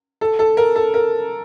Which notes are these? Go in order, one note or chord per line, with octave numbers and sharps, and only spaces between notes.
A4
A4
A#4
A4
A#4